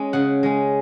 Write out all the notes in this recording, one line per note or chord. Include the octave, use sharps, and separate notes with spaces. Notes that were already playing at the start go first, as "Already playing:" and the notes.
Already playing: G#3 C#4
C#3 F#5
G#3 C#4